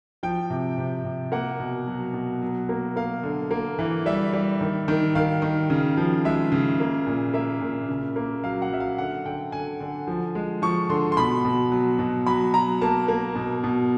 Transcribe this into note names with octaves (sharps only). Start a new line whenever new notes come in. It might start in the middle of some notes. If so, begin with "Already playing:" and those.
F3 G5
C3
C3
C3
A#3 F#5
B2
F#3
B2
F#3
A#3
A#3 F5
D3
A#3
E3
G3 E5
G3
D#3
D#3
D#3 F5
D#3
C#3
F3
G#3 E5
C#3
A#3
A#2
A#3 E5
A#2
C#3
A#3
F#3 F5
F#5
F#3 E5
F5
D3 F#5
D3 G5
D3 G#5
D3
F3
G#3
F3 C#6
D3 C6
C6
B2 B5
B2
F#3
B2
F#3 B5
F#3 A#5
A#3 A5
A#3
B2
B2